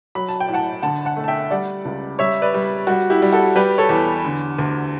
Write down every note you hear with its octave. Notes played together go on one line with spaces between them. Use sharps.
F#3 B5
A5
G5
A2
F#5 A5
D3 F#5 A5
F#5 A5
A3
A5
E5 G5
G3 D5 F#5
C#2
G3 C#5 E5
B4 D5
G3
G3 F#4
E4 G4
G3
F#4 A4
G3 G4 B4
A4 C#5
E2
D3
D2